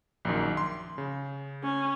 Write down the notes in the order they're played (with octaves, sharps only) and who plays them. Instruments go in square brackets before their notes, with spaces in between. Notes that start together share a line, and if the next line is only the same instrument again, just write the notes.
[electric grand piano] A#1 F#2 D#3
C6
C#3
[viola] C#4